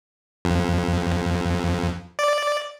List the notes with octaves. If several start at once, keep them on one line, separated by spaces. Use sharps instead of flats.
F2
D5